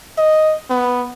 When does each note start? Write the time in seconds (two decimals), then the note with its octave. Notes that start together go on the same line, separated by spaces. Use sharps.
0.18 D#5
0.70 B3